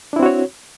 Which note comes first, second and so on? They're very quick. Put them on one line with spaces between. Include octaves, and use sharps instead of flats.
D4 E4 C4 F#4 C#5